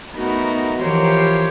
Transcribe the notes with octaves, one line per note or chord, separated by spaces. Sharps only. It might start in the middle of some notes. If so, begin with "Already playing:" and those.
A3 B3 D#4 F#4 A#4
E3 F3 G4 A#4 C5 C#5